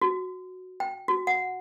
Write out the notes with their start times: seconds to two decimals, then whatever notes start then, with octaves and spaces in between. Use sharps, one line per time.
0.02 F#4
0.80 G5
1.08 F#4
1.27 F#5